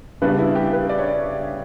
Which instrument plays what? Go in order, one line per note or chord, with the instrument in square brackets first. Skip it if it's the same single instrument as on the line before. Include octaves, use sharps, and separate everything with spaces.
[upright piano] C#3 G3 B3 D4 B4
E4
G4
B4
D5
C#5
D5